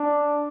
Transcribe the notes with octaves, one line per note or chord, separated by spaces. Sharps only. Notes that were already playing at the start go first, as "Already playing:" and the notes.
Already playing: D4